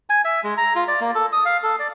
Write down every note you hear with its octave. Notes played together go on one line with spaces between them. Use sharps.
G#5
E5
G#3
A#5
F4
D5
A#3
A4
D#6
F5
A4
D5